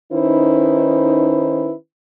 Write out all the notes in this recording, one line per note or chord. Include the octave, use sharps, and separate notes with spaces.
D#3 C#4 D#4 E4 B4 C5